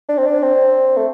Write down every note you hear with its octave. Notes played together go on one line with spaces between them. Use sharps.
D4
C4
D4
C4
A3